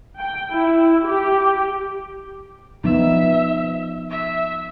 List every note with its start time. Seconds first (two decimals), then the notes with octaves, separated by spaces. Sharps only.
0.19 G5
0.52 E4
1.07 G4
2.84 F3 B3 D#4 E5
4.10 E5